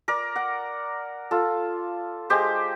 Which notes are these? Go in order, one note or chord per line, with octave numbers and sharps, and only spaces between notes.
A#4 D5
F#5
F4 A4
G#3 G4 C5